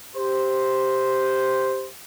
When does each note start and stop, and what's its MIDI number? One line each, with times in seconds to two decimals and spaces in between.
0.15 1.88 67
0.15 1.88 72